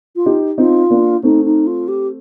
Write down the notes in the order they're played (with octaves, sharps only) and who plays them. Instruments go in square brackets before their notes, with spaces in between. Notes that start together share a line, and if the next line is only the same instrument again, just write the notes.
[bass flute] F4
[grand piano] D#4 G4
[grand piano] C4 D#4 [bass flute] F4
[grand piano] A#3 D4
[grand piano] A3 C4 [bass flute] D#4
[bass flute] D#4
F4
G4